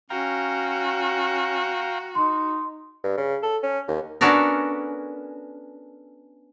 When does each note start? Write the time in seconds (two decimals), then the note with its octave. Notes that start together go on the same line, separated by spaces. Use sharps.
0.10 C#4 F#4 F5 G5 A#5
2.15 D#4 C6
3.04 G2
3.18 C#3
3.43 A4
3.63 C#4
3.88 D#2
4.21 B3 C#4 D4 F#4 A4 A#4